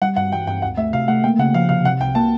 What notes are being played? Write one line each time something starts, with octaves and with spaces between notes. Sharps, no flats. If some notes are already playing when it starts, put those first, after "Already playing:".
G3 F#5
G2 F#5
E3 G5
G2 G5
D2 F#5
A3 E5
C3 F5
A3 F#5
A#3 G5
C#3 F#5
F3 F5
C3 F5
C3 F#5
C2 G5
A#3 A5